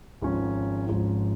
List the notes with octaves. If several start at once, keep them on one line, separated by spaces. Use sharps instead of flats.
G#1 G#2 F3 C#4
G#1 G#2 F3 C#4